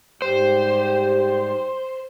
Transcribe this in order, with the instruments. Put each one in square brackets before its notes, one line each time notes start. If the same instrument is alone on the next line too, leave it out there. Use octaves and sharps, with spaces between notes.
[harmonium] G#2 G3 G4 [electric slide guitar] C5